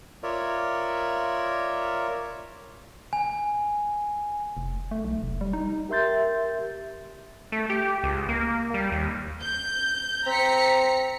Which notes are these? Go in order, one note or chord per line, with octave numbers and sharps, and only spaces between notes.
F4 A#4 C#5 D5 E5
G#5
F1
A3
B1
F1
G3
D#4
G4 A#4 E5 C6 G6 A6
A3
G4
C#2
A#3
G3
D#2
G6
C4 A#5 B6 C#7